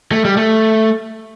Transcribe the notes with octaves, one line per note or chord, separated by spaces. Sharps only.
A3
G3
A3